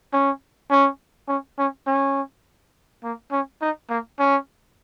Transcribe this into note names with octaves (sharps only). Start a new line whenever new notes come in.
C#4
C#4
C#4
C#4
C#4
A#3
C#4
D#4
A#3
C#4